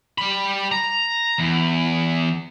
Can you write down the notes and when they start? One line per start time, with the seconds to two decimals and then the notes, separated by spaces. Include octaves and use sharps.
0.18 G3 B5
0.71 A#5
1.39 E2